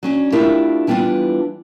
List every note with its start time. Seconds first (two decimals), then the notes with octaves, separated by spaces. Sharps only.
0.03 F#3 C#4 D4
0.32 A3 D4 E4 F4 G4 A#4
0.87 E3 G3 B3 C4 D4 F4